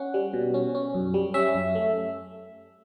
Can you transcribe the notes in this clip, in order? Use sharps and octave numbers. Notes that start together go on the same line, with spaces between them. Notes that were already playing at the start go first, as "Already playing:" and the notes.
Already playing: C#4 F#5
G3
B2
C#4
C#4
F#2
G3
C#4 E5
F#2
A3